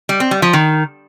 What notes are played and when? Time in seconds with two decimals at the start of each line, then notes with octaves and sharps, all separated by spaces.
0.09 G3
0.20 C4
0.31 G3
0.42 F3
0.53 D#3